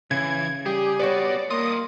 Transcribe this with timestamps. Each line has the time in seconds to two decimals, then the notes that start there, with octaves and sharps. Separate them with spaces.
0.11 C#3 E3 G#6
0.66 G3 G4 G#4
0.99 B3 F#4 B4 C#5 D5
1.50 A#3 F4 D#5 D#6